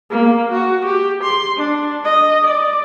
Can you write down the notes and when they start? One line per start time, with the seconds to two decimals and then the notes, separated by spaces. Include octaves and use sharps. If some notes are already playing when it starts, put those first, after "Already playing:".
0.10 A#3
0.52 F#4
0.86 G4
1.24 C6
1.57 D4
2.05 D#5
2.47 D5